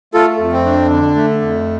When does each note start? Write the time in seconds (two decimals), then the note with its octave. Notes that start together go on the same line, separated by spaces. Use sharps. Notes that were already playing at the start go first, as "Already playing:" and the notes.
0.14 A3 F4 A4
0.39 F2
0.52 C4
0.65 D4
0.90 D3
1.15 A3
1.41 F2